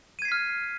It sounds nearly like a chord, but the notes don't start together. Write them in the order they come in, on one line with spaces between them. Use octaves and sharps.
D#7 G#6 C7 B6 F6